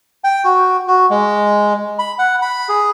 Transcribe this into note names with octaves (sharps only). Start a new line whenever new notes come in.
G5
F#4
F#4
G#3
B5
F#5
B5
G#4